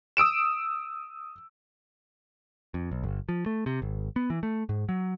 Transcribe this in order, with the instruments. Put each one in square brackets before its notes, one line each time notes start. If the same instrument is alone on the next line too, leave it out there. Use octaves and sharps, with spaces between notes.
[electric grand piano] D#6 E6 D7 E7
[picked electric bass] F2
B1
G1
F3
A3
C3
G#1
B3
E3
A3
G#2
F#3